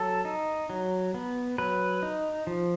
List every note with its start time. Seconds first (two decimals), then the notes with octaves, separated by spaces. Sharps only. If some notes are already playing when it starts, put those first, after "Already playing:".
Already playing: F#3 A4
0.25 D#4
0.70 F#3
1.14 B3
1.58 F#3 B4
2.03 D#4
2.47 F3